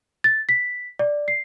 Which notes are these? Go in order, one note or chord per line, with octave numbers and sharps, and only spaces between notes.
A6
B6
D5
C7